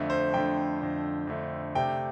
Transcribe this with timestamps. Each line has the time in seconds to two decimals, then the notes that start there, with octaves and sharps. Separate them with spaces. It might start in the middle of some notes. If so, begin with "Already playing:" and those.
Already playing: F2 D3 A3
0.10 C5
0.34 F2 D3 A3 G5
0.81 F2 D3 A3
1.27 F2 D3 A3
1.75 C3 A3 D4 G5